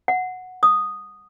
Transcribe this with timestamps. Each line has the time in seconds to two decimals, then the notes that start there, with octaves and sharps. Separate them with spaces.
0.08 F#5
0.63 D#6